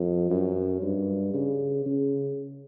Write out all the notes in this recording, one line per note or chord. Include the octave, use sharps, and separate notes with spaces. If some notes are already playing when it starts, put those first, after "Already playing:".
Already playing: F2
F#2
G2
C#3
C#3